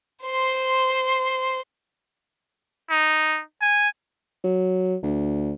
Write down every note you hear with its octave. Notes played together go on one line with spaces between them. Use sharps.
C5 C6
D#4
G#5
F#3
D2